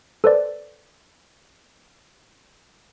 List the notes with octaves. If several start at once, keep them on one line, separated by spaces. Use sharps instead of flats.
A4 B4 C5 D5